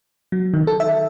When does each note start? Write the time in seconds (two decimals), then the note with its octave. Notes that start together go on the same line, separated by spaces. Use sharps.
0.32 F#3
0.54 D#3
0.67 A4
0.80 E5